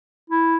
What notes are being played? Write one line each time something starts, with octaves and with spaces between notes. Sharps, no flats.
E4